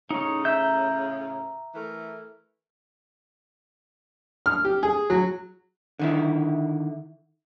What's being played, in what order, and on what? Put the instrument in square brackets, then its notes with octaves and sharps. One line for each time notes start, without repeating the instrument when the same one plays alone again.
[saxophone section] A2 C#3 [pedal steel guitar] D#4 C#5
[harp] E5 [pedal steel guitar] A#5 G6
[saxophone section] E3 A3 A#4
[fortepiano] F6
G4
G#4
F#3
[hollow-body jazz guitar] D3 D#3 E4